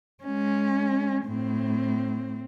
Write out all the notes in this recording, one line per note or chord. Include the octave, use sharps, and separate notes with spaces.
G#3 C#4
A2 C4